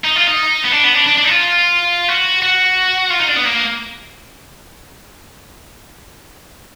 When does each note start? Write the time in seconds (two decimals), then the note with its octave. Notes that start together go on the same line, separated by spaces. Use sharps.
0.04 D#4
0.16 F4
0.27 D#4
0.65 B3
0.72 D4
0.84 B3
0.96 D4
1.07 D4
1.18 D4
1.24 D#4
1.30 F4
2.09 F#4
2.42 F#4
3.10 F4
3.20 D#4
3.28 D4
3.36 B3
3.45 A#3